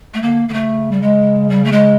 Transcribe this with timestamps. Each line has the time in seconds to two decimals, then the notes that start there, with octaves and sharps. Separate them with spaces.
0.14 A3
0.22 D3 A#3
0.49 D3 A#3
0.53 C#3 A3
0.92 G3
1.02 G#3
1.50 G3
1.65 A3
1.72 G#3